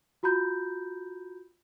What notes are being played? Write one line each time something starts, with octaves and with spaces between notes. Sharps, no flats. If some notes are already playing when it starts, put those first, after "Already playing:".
F4 F#4 A#5 B5 G6